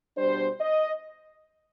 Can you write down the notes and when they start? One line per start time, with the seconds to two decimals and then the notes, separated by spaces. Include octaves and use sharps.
0.17 B2 G3 D4 C5
0.60 D#5